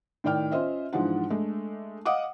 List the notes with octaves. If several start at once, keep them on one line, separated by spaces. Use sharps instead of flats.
A2 D#3 D5 G5 F6
C#4 F4 C5 D#5 E5
G#2 E3 F3 G#3 D4 F#5
G#3 A3 D4
D#5 F5 F#5 D6 D#6